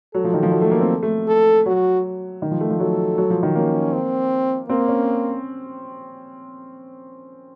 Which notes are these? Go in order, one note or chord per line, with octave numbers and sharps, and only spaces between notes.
F#3 A4
F3
D#3
F3
F#3
A3
A#3
C4
A3
A4
F#3 F#4
D#3
F3
A3
F3
F#3 A4
F#3
F3
D#3
A#3 C#4
C4
A#3 C4
C#4